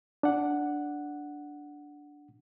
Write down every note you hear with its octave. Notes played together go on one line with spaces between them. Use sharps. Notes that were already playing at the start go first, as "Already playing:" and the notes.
D4 F#5